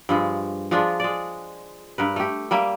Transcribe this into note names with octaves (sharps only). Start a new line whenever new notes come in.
G2 F3 G#3
F3 G#3 D4 F4
G#3 D5
G2 A#4 B4
A3 G4
G3 A#3 E5